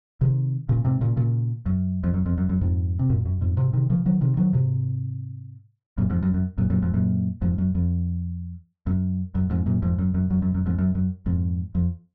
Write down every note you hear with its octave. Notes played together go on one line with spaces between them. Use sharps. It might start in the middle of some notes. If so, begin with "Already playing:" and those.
C3 D#3
A#2 C#3
G#2 C3
A#2 C#3
A#2 C#3
F#2
F2
F#2
F2
F#2
F#2
F2 G#2
C3
F#2 A#2
F#2
F2 G#2
G#2 C3
C3 D#3
C#3 F3
D#3 F#3
C3 D#3
D#3 F#3
G#2 C3
F#2 A#2
F2 G#2
F#2
F#2
F#2 A#2
F#2 A#2
F2 G#2
F#2 A#2
F2 G#2
F#2
F2
F#2
F#2
F2 G#2
F#2 A#2
F2 G#2
F#2
F#2
F#2
F#2
F#2
F2 G#2
F#2
F#2
F2 G#2
F2